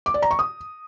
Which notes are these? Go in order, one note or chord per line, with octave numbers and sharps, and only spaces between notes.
D6
D5
A#5
C#6
D#6